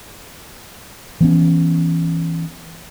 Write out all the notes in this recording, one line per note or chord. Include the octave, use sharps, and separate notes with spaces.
E3 B3 C#4